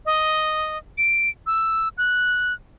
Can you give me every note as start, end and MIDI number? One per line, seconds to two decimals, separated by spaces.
0.05 0.78 75
0.98 1.30 98
1.47 1.88 88
1.98 2.53 90